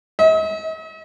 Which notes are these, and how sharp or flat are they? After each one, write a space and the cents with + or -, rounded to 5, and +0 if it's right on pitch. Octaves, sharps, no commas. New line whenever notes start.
D#5 +45